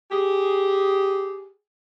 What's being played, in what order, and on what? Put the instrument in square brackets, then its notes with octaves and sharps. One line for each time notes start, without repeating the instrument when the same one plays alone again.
[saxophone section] G4 G#4